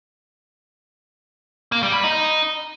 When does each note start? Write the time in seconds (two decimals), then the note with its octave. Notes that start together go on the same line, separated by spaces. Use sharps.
1.72 A#3
1.83 G3
1.93 B4
2.04 D#4